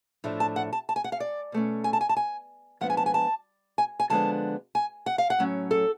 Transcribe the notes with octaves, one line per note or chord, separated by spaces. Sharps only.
A2 F3 A3 D4
A5
F#5
A5
A5
G#5
F#5
F5
D5
B2 A3 C#4
G#5
A5
G#5
A5
G#5
F3 G#3 B3 D4 F#5
G#5
A5
G#5
A5
G#5
G#5
D3 F3 G#3 B3 D4 A5
G#5
F#5
F5
F#5
A2 F#3 C#4
A4